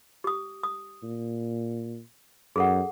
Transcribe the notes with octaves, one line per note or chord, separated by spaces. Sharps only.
G4 D#6
D#6
A#2
F#2 G#4 A4 F#5